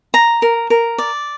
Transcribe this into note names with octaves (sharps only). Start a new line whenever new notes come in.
A#5
A#4
A#4
D5